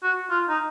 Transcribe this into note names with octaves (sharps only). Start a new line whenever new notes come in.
F#4
F4
D#4